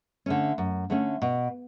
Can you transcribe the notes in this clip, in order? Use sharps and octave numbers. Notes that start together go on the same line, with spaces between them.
D3 A3 C#4
F#2
D3 A3 C#4
B2